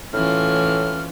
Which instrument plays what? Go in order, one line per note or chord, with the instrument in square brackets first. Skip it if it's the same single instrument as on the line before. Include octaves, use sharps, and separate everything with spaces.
[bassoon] A2 [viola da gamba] E3 C#4 F4 [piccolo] F6